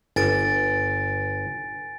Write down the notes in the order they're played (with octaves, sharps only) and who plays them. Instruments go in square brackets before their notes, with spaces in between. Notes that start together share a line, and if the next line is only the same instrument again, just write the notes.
[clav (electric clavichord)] G1 [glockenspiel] G#5 A6 D7